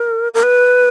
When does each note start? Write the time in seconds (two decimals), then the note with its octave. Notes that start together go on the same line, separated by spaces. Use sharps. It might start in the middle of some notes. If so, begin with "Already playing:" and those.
Already playing: A#4
0.34 A#4
0.43 B4